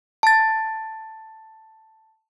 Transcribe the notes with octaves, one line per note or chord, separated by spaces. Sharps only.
A5 A6